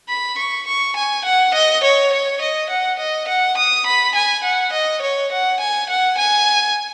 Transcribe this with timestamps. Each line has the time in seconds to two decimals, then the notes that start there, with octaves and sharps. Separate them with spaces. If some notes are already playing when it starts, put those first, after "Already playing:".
0.09 B5
0.38 C#6
0.67 C#6
0.96 G#5
1.25 F#5
1.54 D#5
1.83 C#5
2.13 C#5
2.41 D#5
2.70 F#5
2.99 D#5
3.28 F#5
3.57 D#6
3.86 B5
4.15 G#5
4.44 F#5
4.73 D#5
5.02 C#5
5.32 F#5
5.60 G#5
5.89 F#5
6.18 G#5